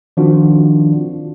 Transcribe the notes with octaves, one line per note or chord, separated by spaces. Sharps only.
D#3 F3 C4 D4 F4 F#4